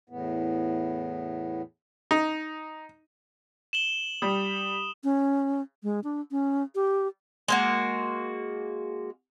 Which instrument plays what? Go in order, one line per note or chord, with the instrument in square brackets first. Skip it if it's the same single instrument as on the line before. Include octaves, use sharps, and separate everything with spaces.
[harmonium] E2 A2 B3
[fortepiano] D#4
[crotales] E7 F#7 G7
[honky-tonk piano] G3 [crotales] D#6
[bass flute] C#4
G#3
D4
C#4
G4
[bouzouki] G#3 A#3 F#4